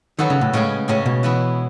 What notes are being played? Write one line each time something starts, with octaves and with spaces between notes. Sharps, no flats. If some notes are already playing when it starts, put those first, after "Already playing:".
D#3 F#3 B3 F#4 A4
C#3
A2
A2 C#3 G#3 C#4 G#4
A2 C#3 G#3 C#4 G#4
B2
E3 B3 E4 G#4